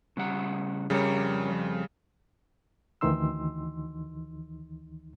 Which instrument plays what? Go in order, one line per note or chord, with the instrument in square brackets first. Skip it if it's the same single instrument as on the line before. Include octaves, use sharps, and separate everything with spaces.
[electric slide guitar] C#3 G3 F#5
[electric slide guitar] F2 A#4 C#5 [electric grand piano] C#3 G3
[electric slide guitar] F2
[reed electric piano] D2 D#3 E3 D#4 C6 E6